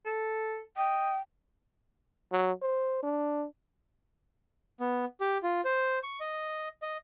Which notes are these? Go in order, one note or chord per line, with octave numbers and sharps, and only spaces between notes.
A4
D#5 G5
F#3
C5
D4
B3
G4
F4
C5
C#6
D#5
D#5